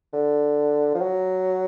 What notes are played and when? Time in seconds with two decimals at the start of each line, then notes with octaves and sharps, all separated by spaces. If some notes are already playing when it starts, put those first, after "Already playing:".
0.13 D3
0.94 F3
1.01 F#3